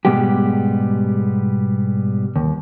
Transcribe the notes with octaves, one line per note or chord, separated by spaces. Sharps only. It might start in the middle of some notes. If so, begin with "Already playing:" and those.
G#2 B2 G3 G#3 B3 G4
D#2